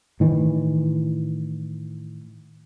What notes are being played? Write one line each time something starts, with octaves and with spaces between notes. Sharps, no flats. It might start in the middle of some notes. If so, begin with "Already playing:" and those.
A2 D#3 E3